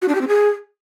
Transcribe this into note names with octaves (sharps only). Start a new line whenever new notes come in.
F#4
D4
G4
C4
G#4